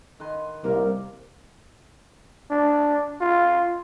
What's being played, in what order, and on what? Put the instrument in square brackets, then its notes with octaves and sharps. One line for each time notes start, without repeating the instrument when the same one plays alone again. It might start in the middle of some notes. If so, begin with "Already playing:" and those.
[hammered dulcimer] D#3 B4 C6
[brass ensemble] C2 [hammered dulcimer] A#3 [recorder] A#4
[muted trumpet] D4
F4